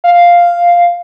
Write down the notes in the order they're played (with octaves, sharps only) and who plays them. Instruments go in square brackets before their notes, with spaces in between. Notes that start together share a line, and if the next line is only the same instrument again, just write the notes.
[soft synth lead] F5